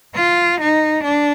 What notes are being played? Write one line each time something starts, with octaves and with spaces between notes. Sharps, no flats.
F4
D#4
D4